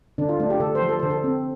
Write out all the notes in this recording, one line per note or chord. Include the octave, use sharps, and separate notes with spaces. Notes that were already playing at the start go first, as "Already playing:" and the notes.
D3 D4
F4
A3 D4
G4
D3 A4
C5
F3
A4
D3 C5
A4
C4